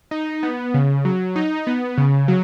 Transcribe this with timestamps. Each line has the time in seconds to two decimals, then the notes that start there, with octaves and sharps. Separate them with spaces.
0.11 D#4
0.43 B3
0.74 C#3
1.05 F#3
1.36 D#4
1.67 B3
1.98 C#3
2.28 F#3